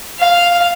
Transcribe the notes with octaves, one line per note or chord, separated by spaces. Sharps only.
F5